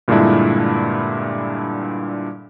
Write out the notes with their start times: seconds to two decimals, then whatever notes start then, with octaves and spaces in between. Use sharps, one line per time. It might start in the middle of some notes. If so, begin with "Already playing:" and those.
0.08 G2 A#2 D3 G#3 D4 E4